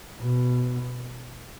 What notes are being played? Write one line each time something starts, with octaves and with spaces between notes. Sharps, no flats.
B2